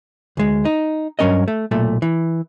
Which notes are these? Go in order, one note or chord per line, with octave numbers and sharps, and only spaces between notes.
D2 G#3
D#4
G2 F#3 C#4 A#4 D#5
A3
B1 A#2 A3
E3